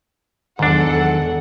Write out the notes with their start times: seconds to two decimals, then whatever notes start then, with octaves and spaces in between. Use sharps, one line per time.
0.59 E2 G#2 D#3 F#3 D4 A4 F#5